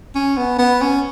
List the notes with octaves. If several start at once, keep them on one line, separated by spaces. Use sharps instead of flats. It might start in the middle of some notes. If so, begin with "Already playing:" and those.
C#4
B3
B3
C#4